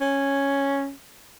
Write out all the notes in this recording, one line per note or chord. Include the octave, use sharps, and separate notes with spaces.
C#4